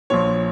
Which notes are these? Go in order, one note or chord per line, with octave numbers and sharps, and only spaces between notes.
A#1 A#2 C#5